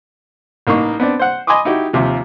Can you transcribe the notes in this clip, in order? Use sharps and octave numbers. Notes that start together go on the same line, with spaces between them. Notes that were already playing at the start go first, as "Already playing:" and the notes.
A1 A#3 D#4 C#6
B3 C4 D4
C5 F#5
D#5 G#5 B5 C6 D6 D#6
D#4 E4 F#4 G4
D#2 C3 F3